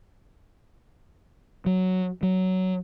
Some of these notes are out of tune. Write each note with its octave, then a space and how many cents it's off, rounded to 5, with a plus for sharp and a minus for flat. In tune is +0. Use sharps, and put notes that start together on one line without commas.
F#3 +0
F#3 +10